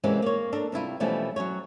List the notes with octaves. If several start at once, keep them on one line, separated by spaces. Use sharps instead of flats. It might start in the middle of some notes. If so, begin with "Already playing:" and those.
C3 E3 G#3 A#3 C4 C#4
A#3 C#5
D4 A4 A#4
C3 G3 E4 F4
B2 E3 F3 G3 A3 C#4
F#3 C#4 F#4 C#5